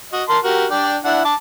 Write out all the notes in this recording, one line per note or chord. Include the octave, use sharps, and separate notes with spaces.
F#4 D#5
A#4 A5 C6
F#4 G4 A#4
D4 D5 G5
D4 E4 F#5
A5 D6